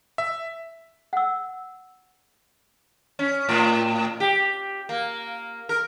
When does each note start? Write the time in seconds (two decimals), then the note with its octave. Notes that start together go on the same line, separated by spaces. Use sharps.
0.18 E5
1.13 F#5 E6
3.19 C#4
3.49 A2
4.20 G4
4.89 A#3
5.69 A#4